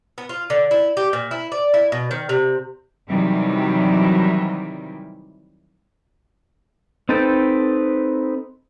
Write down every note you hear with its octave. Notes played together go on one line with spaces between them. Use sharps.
B3
F4
D3
E4
G4
A#2
E4
D5
E4
B2
D#3
C3
C3 D#3 E3 F#3 G3
C4 D#4 A4 B4 G5